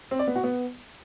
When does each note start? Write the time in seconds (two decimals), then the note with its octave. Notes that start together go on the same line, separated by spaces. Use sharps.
0.11 C4
0.19 D5
0.27 B3
0.36 F#4
0.44 B3